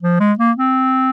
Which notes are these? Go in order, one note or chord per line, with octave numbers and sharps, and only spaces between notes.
F3
G#3
A#3
C4